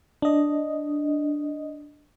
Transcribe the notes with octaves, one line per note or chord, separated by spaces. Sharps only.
D4 D#5